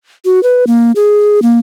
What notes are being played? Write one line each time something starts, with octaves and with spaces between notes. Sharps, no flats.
F#4
B4
A#3
G#4
A#3